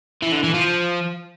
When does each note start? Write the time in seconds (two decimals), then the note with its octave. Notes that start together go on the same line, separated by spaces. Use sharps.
0.23 E3
0.32 D3
0.44 E3
0.54 F3